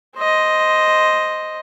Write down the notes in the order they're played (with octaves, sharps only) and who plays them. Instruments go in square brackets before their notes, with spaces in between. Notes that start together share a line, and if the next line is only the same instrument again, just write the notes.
[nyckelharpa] C5 D#5